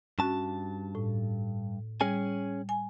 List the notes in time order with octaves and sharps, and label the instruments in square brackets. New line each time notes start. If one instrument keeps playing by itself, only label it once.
[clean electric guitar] G2 A5 [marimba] C#4 F#4
[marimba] A2
[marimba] G3 [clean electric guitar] C#4 G#4 G#5
[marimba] G#5